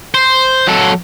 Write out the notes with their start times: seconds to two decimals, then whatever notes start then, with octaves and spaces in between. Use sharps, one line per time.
0.14 C5
0.67 F#3 A4